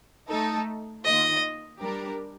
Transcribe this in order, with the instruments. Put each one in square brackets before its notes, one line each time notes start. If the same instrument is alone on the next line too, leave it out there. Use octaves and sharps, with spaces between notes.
[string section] A3 D#4 A4
[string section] D#3 A#3 F4 [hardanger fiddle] D#5
[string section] G3 D4 G4 A#4